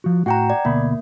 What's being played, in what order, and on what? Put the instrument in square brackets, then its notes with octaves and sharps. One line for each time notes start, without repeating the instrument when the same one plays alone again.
[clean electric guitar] F3 F#4
[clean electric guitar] A2 F#4 [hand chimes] F#5 G5 A#5
[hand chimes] D5
[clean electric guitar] D2 B2 B5 [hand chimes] A#3